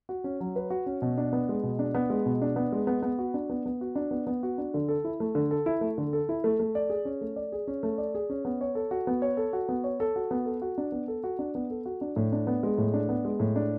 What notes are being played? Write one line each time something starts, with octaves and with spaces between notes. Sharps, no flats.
F#4
C#4
F#3
B4
F#4
C#4
B2
D4
B3
G#3
B2
D4
B3
G#3
B2
D4
B3
G#3
B3
B3
F#4
D4
B3
B3
F#4
D4
B3
B3
F#4
D4
D3
A4
E4
A3
D3
A4
E4
A3
D3
A4
E4
A3
A3
D5
G#4
C#4
A3
D5
G#4
C#4
A3
D5
G#4
C#4
B3
C#5
A4
F#4
B3
C#5
A4
F#4
B3
C#5
A4
F#4
B3
A4
F#4
D4
B3
A4
F#4
D4
B3
A4
F#4
D4
A2
D4
B3
G#3
A2
D4
B3
G#3
A2
D4